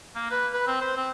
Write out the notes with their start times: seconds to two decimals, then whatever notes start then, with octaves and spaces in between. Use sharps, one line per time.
0.15 A#3
0.31 B4
0.54 B4
0.67 C4
0.81 C5
0.97 C4